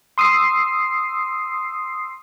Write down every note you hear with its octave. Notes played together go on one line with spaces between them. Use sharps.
C6 D#6 E6 C7